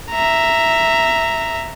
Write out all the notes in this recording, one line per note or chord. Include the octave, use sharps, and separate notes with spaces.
E5 A#5